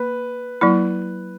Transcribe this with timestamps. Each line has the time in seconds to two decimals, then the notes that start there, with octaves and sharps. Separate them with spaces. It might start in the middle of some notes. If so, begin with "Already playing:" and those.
Already playing: A#3 B4
0.61 F#3 A#3 E4